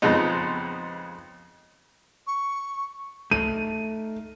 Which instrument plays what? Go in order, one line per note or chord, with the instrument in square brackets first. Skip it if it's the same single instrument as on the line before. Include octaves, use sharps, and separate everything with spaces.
[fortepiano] F2 C#3 G#3 B3 C4 D#4
[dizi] C#6
[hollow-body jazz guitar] A3 D#4 [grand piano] D#7